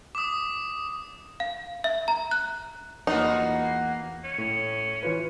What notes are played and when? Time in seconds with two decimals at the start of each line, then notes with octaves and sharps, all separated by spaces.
0.15 D6 D#6
1.40 F5
1.84 E5
2.08 A#5
2.31 F#6
3.07 E2 A#3 D#4 F4 F#4 B4
4.24 C#4
4.38 A2
5.03 E3 F4 B4